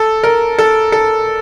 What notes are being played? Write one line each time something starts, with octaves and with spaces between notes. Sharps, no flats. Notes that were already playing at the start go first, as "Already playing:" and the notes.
Already playing: A4
A#4
A4
A4